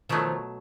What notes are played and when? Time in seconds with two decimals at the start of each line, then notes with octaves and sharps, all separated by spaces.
0.09 B2 D#3 F3 F#3 A3